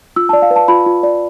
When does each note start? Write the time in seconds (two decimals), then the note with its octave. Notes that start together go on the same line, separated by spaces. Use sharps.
0.16 F4 E6
0.29 D5 A5
0.42 F5
0.51 B4
0.56 A5
0.68 F4 B5
0.86 F4
1.03 D5